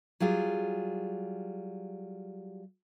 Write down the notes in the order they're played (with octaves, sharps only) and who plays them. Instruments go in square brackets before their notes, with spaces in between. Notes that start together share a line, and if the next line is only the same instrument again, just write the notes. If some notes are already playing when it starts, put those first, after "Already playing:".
[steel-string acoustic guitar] F#3 G3 F4 G#4